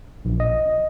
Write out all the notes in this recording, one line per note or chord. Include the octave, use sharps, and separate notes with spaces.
A#1
D#5